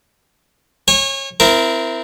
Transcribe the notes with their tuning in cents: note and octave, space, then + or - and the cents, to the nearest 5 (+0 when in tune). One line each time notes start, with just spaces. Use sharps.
C#5 -25 G#5 -35
C4 -20 E4 +10 A#4 +0